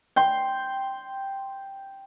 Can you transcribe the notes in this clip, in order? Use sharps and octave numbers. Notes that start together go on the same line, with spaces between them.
G5 C6